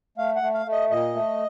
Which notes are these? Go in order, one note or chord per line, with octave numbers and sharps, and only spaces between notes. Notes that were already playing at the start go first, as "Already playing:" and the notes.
A3 F5
F#5
A3
F5
A3
D#5
A#2 D#5
A3